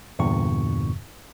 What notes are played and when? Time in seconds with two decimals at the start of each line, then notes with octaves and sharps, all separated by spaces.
0.19 E2 G2 A#2 D3 C#6